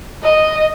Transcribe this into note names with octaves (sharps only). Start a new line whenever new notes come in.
D#5